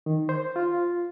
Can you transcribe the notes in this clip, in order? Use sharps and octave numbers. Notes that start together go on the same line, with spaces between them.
D#3
C5
F4